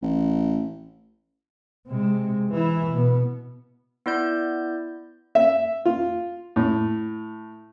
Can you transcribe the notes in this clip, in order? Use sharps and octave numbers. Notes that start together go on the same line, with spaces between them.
A1
C3 G#3
E3 E4
B2 B3
B3 E4 D5 G6
E5
F4
A2